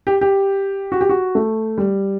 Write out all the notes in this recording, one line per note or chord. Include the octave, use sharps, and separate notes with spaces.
G4
G4
F#4
G4
F#4
A3
G3